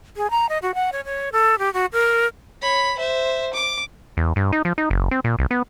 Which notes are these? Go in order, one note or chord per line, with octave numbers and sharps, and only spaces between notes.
G#4
A#5
D#5
F#4
F#5
C#5
C#5
A4
G4
F#4
A#4
C#5 B5
C5 E5
D6
E2
G2
D#4
F3
D#4
F#1
C4
A#2
C2
B3